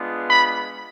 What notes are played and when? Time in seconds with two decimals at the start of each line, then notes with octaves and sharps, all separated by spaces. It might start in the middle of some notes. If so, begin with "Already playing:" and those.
Already playing: G#3 B3 D4 F4
0.29 B5